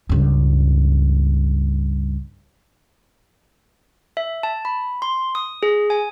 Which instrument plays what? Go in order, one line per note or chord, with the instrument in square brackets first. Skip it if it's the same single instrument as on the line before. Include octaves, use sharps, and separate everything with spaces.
[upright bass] C#2 G2
[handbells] E5
A5
B5
C6
D#6
G#4
G#5